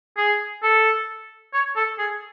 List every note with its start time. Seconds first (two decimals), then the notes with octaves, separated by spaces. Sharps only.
0.18 G#4
0.63 A4
1.54 C#5
1.76 A4
1.99 G#4